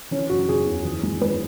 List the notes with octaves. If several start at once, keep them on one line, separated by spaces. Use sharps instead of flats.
E3 C#4
F#1 F#4
F#1 G#4
E2
E3
G#1
G#1 B4